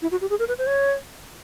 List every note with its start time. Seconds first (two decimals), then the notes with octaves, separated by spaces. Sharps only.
0.02 E4
0.11 F#4
0.21 G4
0.30 G#4
0.39 A#4
0.48 B4
0.58 C5
0.67 C#5